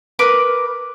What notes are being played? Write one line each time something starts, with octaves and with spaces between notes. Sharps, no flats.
A#4 B4 D6